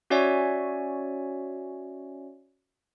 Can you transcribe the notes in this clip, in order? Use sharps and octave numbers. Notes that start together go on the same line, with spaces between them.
C#4 F#4 C#5 D5 E5 G#5